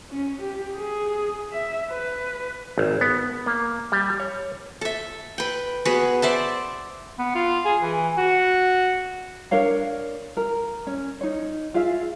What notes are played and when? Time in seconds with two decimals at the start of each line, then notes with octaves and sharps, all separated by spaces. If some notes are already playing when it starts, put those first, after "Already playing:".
0.10 C#4
0.41 G4
0.76 G#4
1.52 E5
1.91 B4
2.78 G#1
3.01 B3
3.46 A#3
3.92 G3
4.20 C#5
4.81 A4 E5
5.38 B4 G5
5.85 B3 F#4 G#4 B4
6.22 C5 D5 E5 A5
7.19 B3
7.35 F4
7.65 G#4
7.82 E3
8.17 F#4
9.51 D4 A#4 C#5 F5
10.37 A#4
10.87 C#4
11.21 D#4 C#5
11.74 F4 G#4 E5 F5